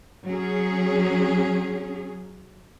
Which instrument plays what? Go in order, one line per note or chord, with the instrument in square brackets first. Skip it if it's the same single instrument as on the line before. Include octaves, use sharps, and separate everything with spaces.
[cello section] F#3 C#4 G#4